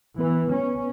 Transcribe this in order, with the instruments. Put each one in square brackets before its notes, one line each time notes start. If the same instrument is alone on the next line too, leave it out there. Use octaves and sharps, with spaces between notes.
[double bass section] E3 [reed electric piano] B3 B4
[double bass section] C#4